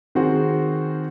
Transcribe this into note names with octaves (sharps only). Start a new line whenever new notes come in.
D#3 C4 F#4 G#4